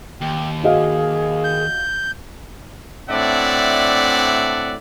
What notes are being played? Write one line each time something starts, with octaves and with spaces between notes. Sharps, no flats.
D#2 G5
F#4 G#4 D#5 F5
G6
A2 C4 D4 D5 E5 F#5